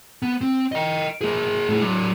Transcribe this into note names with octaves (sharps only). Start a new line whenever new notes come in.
B3
C4
D#5 G5
A#3 G#4
A2 G#4
F#3 D4